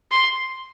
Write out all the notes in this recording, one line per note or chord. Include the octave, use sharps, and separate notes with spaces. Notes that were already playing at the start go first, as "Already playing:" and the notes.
C6